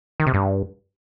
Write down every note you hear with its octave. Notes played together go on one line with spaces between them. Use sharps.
D#3
C3
G2